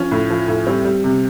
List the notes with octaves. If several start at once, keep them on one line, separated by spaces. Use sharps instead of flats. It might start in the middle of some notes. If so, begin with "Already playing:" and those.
Already playing: F3 C#4
A2
F3
A2
G3 C4
G3
C3